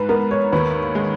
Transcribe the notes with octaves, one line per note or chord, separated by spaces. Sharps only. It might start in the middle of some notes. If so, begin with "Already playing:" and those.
Already playing: G#2 B4
B3 A#4
C#5
D#2 B4
G#3